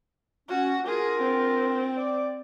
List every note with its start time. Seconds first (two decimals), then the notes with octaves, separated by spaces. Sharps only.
0.49 C#4 F#4
0.87 D4 F4 G#4 A#4
1.22 C4
1.97 D5